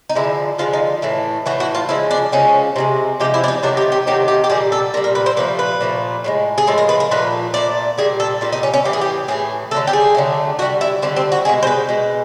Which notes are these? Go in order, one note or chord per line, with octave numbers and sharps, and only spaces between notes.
D#4
D3 F3 G#3 E4
D3 F3 G#3 F4
D#4
A2 E3 A3
A2 E3 A3 F#4
F#4
F4
C#3 F3 G#3 E4
D4
C#3 F3 G#3 C#4
C3 F3 G#3
C3 F3 G#3 G4
E4
D4
D#4
C3 D#3 F#3 A3 D4
G4
G4
C3 D#3 F#3 A3 G4
G4
G4
A#2 G3 G#4
A4
A#2 G3 A#4
A#4
B4
C5
A#2 F3 A3 B4
B4
A#2 F3 A3
A2 F3 G#3
G#4
A2 F3 G#3 A4
A#4
B4
A#4
A#2 F3 A3 B4
A#2 F3 A3 D5
A#2 G3 G#4
A4
A#2 G3 F4
D#4
C#4
C#4
A2 E3 A3 G4
G#4
G4
A2 E3 A3 G#4
D3 F#3 A3 A4
G4
G#4
D3 F#3 A3
D3 F#4
G3
E4
D3 G3 C4
C4
F#4
B2 G#3 G#4
C5
B4
B2 G#3